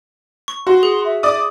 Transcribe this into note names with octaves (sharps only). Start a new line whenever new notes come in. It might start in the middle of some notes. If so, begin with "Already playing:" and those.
C#6
F#4 C6
G#4
E5
D5 D6 D#6